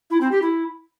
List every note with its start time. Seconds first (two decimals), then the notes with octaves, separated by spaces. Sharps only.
0.11 E4
0.21 C4
0.32 G4
0.42 E4